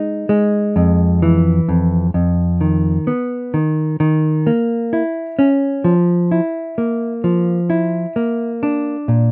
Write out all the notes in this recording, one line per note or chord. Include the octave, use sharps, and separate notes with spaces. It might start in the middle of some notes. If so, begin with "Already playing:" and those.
Already playing: G#3 D#4
G#3
F2
E3
F2
F2
D#3
B3
D#3
D#3
A#3
E4
C#4
F3
E4
A#3
F3
E4
A#3
D4
A#2